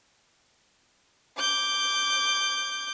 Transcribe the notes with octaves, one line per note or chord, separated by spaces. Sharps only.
D6 G6